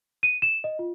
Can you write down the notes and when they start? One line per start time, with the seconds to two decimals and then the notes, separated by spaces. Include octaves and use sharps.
0.23 D#7
0.42 E7
0.64 D#5
0.79 F4